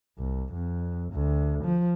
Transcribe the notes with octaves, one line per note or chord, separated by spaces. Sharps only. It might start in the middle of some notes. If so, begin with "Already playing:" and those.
C2
F2
D2
F3